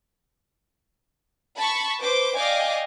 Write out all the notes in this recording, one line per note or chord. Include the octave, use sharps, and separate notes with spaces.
A5 B5 C#6
B4 C5 D6
D5 D#5 F5 G5 G#5 D6